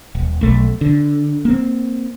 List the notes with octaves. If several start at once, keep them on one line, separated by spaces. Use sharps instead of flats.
D#1
B1 A3
D3
A#3 C4